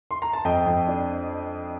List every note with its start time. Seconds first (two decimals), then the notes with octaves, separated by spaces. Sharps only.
0.11 C6
0.22 A#5
0.33 A5
0.45 F2 D#5 G5
0.66 F2
0.87 D4